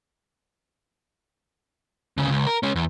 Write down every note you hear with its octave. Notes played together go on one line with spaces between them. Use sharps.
D2 C#3
C#2
A#4
G#3 C#4
E2